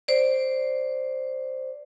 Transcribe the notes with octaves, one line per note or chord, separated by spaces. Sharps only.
C5 D5